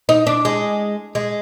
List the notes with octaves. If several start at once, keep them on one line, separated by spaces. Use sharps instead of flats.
D#4
D4
G#3
G#3